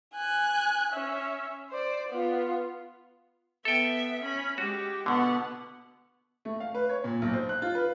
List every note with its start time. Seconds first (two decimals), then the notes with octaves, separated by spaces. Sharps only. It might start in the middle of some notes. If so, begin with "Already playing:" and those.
0.14 G#5 F#6
0.92 C#4 E5
1.70 C5 D5
2.09 B3 F4
3.65 B3 A4 E5 G5
4.22 C#4 B5
4.58 G#3 F#4 G4
5.06 B2 D3 B3 F#5
6.45 A3
6.60 F5
6.75 B4
6.89 C#5
7.04 A#2
7.22 B1
7.33 C5
7.49 F#6
7.62 F4
7.75 B4